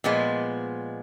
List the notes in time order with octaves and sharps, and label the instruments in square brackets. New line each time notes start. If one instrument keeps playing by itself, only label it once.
[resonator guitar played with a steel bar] A#2 F3 G#3 B3